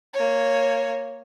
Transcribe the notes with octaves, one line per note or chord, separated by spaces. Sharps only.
A#3 C#5